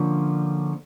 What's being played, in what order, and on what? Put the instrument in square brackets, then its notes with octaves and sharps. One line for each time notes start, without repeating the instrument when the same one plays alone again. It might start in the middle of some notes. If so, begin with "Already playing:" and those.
Already playing: [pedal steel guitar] D3 F3 A#3 C#4